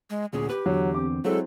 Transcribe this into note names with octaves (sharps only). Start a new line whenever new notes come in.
G#3
D2 A#2 C#4 G#4
G4 B4
E2 D3 F#3
C4 D6
F#3 G#3 C4 E4 A4